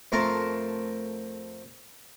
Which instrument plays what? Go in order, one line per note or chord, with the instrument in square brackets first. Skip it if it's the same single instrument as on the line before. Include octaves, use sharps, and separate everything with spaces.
[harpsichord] F2 A3 A#4 A5 A#5 C6